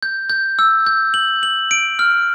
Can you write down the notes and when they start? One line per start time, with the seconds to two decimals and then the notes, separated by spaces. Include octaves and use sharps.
0.03 G6
0.30 G6
0.59 E6
0.86 G6
1.14 F#7
1.43 F#7
1.71 D7
1.99 F6